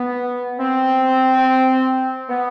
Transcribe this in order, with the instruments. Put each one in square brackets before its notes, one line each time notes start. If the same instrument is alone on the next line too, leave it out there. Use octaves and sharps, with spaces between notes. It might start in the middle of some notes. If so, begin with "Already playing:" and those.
Already playing: [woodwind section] B3
C4
B3